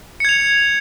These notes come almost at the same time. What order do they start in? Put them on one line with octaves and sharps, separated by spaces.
C#7 G#6 F7